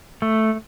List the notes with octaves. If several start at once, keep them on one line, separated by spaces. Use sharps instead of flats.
A3